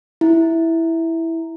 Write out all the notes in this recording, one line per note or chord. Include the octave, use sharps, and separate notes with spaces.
E4